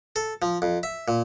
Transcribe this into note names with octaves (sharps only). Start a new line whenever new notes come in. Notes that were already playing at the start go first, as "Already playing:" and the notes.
A4
F3
F2
E5
A#2